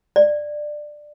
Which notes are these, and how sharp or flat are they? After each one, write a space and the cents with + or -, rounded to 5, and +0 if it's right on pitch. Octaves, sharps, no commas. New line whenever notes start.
D5 +15